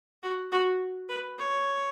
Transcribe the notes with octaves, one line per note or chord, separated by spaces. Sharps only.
F#4
F#4
B4
C#5